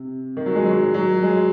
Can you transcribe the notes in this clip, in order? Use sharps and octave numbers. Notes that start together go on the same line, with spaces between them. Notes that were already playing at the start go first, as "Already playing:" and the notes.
Already playing: C3
D#3
F#3
G#3
F#3
F#3
G#3